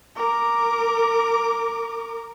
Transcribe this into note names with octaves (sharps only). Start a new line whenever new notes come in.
A#4 D6